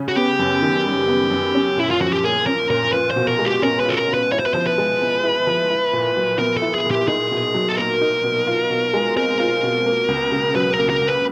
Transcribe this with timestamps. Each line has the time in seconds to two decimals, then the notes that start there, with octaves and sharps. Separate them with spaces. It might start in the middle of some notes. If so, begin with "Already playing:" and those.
Already playing: C#3 C#4
0.08 F#4
0.16 B3 G4
0.39 F#2
0.62 D#3
0.85 G3
1.08 B3
1.31 F#2
1.54 C#4
1.77 A#2 E4
1.91 F4
2.00 F3 F#4
2.13 G4
2.23 A#3 G#4
2.46 C#4 A#4
2.70 A#2 A#4
2.93 F4 B4
3.11 C5
3.16 B2
3.28 A#4
3.39 G#3
3.45 G4
3.62 C#4 A#4
3.80 B4
3.85 F4 A4
3.97 A#4
4.08 B2
4.14 B4
4.32 E4 C#5
4.39 C5
4.46 B4
4.54 F3 C5
4.67 B4
4.78 G#3
5.01 B3
5.24 E4
5.47 F3
5.70 E4
5.93 A#2
6.16 F#3
6.39 B3 A#4
6.57 A4
6.62 E4
6.75 G#4
6.85 A#2
6.91 G4
7.08 D#4 G#4
7.31 B2
7.54 F#3
7.69 A4
7.78 A#3 A#4
8.01 D#4
8.24 B2
8.47 F4
8.70 B2
8.94 G#3
9.16 C4 A#4
9.39 F4
9.63 B2
9.86 A#3
10.08 C#2
10.32 C#3
10.55 F#3 B4
10.73 A#4
10.78 A#3
10.90 A#4
11.01 C#2
11.08 B4